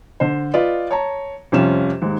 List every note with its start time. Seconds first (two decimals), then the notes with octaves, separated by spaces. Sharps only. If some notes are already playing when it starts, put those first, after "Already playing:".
0.20 D3 C5
0.54 F4 B4 D5 D#5
0.91 C#5 A5 A#5
1.52 F2 C3 G3 C#4 F4 E7
2.02 D#2 G#2